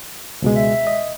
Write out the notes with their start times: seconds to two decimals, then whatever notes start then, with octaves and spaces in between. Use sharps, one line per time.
0.42 C#2 B2 G#3
0.56 E5
0.87 D#5